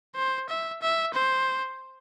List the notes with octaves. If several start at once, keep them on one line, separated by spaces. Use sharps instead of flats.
C5
E5
E5
C5